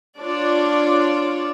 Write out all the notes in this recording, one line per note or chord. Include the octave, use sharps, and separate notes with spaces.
D4 F4 C#5 D5